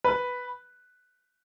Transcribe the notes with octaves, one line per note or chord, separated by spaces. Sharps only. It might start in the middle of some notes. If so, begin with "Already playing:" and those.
B4